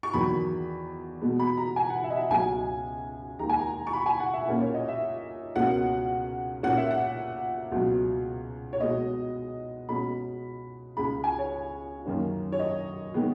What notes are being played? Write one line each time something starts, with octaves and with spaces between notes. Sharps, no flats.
C#6
E2 D#3 F#3 B5
B2 G#3 B3
B5
A#5
G#5
F#5
E5
D#5
E5
C#2 B2 F#3 C#4 G#5
D#2 D#3 G#3 A#5
G#5
A#5
C#6
B5
G#5
F#5
E5
A#2 A#3 C#4
C#5
D#5
E5
C#2 B2 A#3 C#4 F#5
A#2 A#3 C#4 F#5
E5
F#5
C#2 B2 F#3
C#5
B2 G#3 B3 D#5
B2 G#3 C#4 B5
C#2 C#3 G#3 B5
G#5
C#5
F#2 D#3 A#3 C#4
C#5
D#5
D#3 G#3 B3